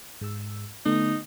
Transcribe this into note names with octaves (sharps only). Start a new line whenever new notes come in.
G#2 E6
D3 A3 B3 D#4